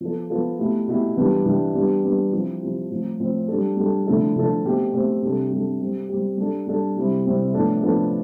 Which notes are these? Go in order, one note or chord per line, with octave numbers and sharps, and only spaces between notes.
F3 B3 F4 A4
F3 B3 F4 A4
B2 A3 E4 G4
B2 A3 E4 G4
E3 G3 B3 D4 G4
E3 G3 B3 D4 G4
G3 B3 D4 G4
G3 B3 D4 G4
F3 C4 E4 G4
F3 C4 E4 G4
A2 F3 C4
A2 F3 C4
G3 D4 A4
G3 D4 A4
D3 F3 A3 E4 A4
D3 F3 A3 E4 A4
B2 A3 C4 G4
B2 A3 C4 G4
C3 G3 D4 A4
C3 G3 D4 A4
G3 C4 G4
G3 C4 G4
G3 D4 A4
G3 D4 A4
C3 G3 C4 E4
C3 G3 C4 E4
A2 F3 B3 D4 A4
A2 F3 B3 D4 A4